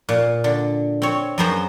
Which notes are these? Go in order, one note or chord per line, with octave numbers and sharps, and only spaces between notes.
A#2
D3
C4 C#5
F#2 F#3 B3 G#4 C5 A#5